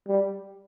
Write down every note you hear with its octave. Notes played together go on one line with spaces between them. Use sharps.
G3